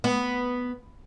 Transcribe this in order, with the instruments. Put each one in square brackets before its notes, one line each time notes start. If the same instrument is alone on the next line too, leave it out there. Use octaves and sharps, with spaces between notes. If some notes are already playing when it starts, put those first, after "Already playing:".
[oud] B3